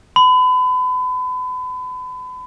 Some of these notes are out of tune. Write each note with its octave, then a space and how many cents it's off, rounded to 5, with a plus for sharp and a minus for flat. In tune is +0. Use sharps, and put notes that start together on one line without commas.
B5 +35